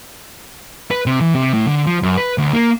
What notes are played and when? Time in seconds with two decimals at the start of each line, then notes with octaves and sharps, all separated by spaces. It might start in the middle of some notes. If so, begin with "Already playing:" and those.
0.91 B4
1.06 C3
1.21 E3
1.35 C3
1.54 A2
1.67 D3
1.87 F3
2.03 F#2
2.17 B4
2.38 D2
2.53 A#3